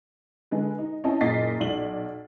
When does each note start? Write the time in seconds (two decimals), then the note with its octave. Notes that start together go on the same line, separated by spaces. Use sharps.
0.51 D3 G#3 A4 B4
0.78 D#4
1.04 C4 C#4 E4 D#5 A5
1.21 F#1 A#2 D#5 A6 B6 C7
1.60 B1 D5 F#7